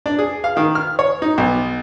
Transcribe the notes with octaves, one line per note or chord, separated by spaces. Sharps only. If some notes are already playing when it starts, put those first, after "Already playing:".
D4
G#4
F5
D#3
F6
C#5
D#4
B1